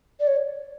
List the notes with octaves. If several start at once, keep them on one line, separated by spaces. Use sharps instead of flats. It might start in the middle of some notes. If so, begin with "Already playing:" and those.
D5
C#5